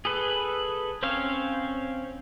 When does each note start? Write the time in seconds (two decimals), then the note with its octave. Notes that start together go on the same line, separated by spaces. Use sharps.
0.05 G#4 A4 B4
1.03 C4 C#4 C5 C#5 F5